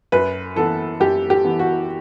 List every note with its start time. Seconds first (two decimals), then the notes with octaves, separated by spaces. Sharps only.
0.12 F#2 B4
0.56 E3 B3 A4
1.00 F#2 G4
1.30 G4
1.45 E3 B3
1.59 F#4